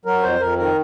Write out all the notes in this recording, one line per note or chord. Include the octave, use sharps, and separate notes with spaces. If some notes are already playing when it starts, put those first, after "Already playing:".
F#3 A#4
F2 C5
F2 A#4
D#3 A#4